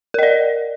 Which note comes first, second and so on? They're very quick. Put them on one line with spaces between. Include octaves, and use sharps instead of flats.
A#4 D#5 D5